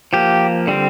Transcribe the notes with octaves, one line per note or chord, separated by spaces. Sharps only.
F3 A#3 G4
D3 G3 C4